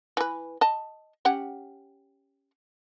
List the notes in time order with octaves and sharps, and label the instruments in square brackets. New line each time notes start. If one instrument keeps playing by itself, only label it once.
[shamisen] E3 B4
D#5 A5
C#4 G4 F#5